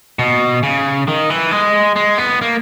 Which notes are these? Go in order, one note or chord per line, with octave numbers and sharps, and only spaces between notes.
B2
C#3
D#3
E3
G#3
G#3
B3
A#3